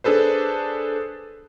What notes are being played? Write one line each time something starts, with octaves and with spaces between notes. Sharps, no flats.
D4 G#4 A4 B4 C5